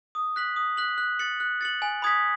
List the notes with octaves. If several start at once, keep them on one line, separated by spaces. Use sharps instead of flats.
D#6
F#6 B6 F#7
D#6
F#6 B6 F#7
F#6
A6 C#7 F#7
F#6
A6 C#7 F#7
G#5
B5 D#6 G#6 B6